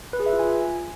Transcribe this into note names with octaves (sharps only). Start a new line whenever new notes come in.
B4
G#4
E5
F4
G#5